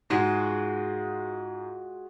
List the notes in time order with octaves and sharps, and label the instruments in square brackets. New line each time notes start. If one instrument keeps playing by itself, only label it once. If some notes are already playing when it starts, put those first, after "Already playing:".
[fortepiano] G#2 [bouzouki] G#3 F4 F#4